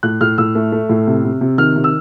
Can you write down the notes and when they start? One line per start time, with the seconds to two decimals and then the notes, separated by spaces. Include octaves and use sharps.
0.03 A2 F#6
0.21 A2 F6
0.38 A2 E6
0.55 A3
0.72 A3
0.89 A2
1.07 C3
1.24 C3
1.41 C3
1.58 D#3 F6
1.76 C3
1.84 E6